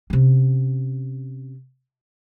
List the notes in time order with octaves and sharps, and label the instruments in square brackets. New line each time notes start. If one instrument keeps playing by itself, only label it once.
[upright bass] C3 C#4